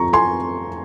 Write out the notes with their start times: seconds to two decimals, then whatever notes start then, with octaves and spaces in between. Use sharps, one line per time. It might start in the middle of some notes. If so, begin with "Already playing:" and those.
Already playing: F2 F3 A#5 C#6
0.13 G#5 C6